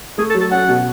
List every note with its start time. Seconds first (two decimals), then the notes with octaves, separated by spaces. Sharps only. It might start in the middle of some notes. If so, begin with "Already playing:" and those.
0.18 A3 G#4
0.30 A4
0.35 F#3
0.41 A4
0.51 C#4 F#5
0.69 B2